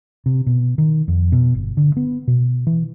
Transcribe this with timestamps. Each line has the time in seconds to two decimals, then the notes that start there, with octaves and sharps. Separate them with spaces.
0.26 C3
0.46 B2
0.78 D#3
1.08 F2
1.32 B2
1.54 G1
1.77 D3
1.97 B3
2.28 B2
2.67 E3